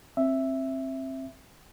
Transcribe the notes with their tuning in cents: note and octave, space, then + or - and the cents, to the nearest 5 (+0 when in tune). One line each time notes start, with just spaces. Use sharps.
C4 +25 E5 +0